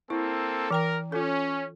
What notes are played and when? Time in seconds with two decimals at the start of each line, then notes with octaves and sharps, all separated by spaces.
0.10 A#3 C4 E4 A4
0.71 E3 A#4 G5 A#5
1.12 C#4 F4 A4